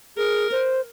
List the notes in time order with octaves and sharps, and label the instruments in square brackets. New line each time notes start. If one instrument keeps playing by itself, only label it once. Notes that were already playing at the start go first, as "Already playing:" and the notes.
[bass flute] G#4 [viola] A#4
[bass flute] C5